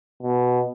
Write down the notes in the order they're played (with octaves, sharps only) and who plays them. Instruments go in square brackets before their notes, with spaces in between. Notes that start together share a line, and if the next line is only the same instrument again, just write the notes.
[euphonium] B2